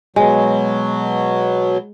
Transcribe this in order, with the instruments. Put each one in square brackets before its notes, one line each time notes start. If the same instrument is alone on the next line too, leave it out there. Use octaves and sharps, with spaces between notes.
[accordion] B2 F#3 [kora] G#3